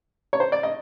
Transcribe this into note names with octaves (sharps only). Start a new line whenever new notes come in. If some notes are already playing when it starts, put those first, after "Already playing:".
C#5
C5
D5
D#5